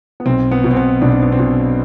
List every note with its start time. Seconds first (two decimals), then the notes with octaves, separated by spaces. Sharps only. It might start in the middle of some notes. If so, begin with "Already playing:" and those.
0.20 B3
0.26 B1 C4
0.51 B3
0.64 B2
0.71 C4
0.77 B3
1.02 B1 D4
1.12 C4
1.22 B3
1.32 C4
1.39 B2